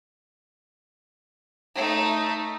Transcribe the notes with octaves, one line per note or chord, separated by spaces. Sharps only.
A3 D#4